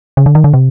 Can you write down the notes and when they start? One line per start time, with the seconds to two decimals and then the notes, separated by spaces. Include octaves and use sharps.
0.17 C#3
0.26 D3
0.35 D#3
0.44 D3
0.54 C3